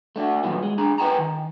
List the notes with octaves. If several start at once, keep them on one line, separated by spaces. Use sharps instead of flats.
A3 D4 F#4
A#2 D#3 E3 F#3 B3
G#3
D4 G#4 A#5
A#4 B4 E5 G5 G#5 A#5
D#3